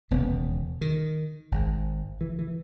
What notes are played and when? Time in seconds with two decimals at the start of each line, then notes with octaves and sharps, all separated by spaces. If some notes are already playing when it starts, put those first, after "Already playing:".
0.11 E1 D#2 C#3 B3
0.81 D#3
1.52 G#1 G#2
2.21 E3
2.39 E3